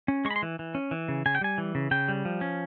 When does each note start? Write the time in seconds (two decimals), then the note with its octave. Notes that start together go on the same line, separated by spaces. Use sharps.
0.08 C#4
0.25 G#3 C#6
0.31 B5
0.36 C6
0.43 E3
0.59 E3
0.75 C#4
0.91 E3
1.08 C#3
1.26 C#3 G#5
1.35 G5
1.41 G3 G#5
1.58 E3
1.75 C#3
1.91 C#3 G5
2.08 G3
2.25 F3
2.41 C#4